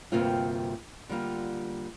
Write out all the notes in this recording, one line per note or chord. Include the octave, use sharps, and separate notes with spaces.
D2 G2 C3 A#3 C4 F4
D3 G3 A#3 F4